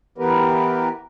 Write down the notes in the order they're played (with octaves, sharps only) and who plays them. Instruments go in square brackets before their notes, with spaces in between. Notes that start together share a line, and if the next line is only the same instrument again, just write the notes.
[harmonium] E3 B3 G4 A#4 B4